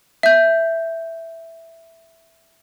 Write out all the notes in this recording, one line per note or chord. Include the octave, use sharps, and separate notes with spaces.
E5 G6